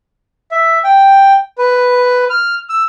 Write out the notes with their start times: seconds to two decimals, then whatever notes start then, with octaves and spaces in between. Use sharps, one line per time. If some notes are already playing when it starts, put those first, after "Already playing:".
0.51 E5
0.84 G5
1.58 B4
2.30 F6
2.69 E6